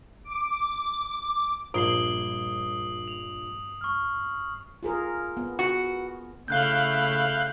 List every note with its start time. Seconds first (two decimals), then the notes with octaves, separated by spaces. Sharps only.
0.24 D6
1.74 A#1 G2 D#6 C7 D7 F#7 G7
3.08 F7
3.81 C#6 F6
4.83 F4 G#4 A#4
5.37 B3
5.59 F#4
6.48 C#3 A3 E4 F5 F#6 G6